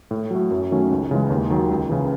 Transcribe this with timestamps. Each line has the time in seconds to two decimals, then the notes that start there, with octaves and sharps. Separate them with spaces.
0.11 A2
0.31 F#3 A3
0.51 F#2
0.71 D#3 F#3 A3 C#4
0.91 C#2
1.11 C#3 E3 G#3
1.30 D#2
1.50 D#3 F#3
1.70 C#2
1.89 C#3 E3